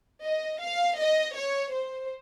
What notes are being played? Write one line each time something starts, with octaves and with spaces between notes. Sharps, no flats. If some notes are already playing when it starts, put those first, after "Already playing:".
D#5
F5
D#5
C#5
C5